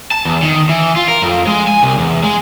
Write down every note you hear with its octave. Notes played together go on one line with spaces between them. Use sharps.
A5
E2
D#3
E3
F4
A#4
F2
G#3
G#5
C2
E2
G#3